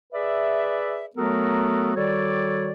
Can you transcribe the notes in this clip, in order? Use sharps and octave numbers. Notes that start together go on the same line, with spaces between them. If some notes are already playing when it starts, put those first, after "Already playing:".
G#4 B4 D5 E5
F#3 A3 B3 F#4 A4 A#4
D#3 G3 F#4 A4 C#5 D5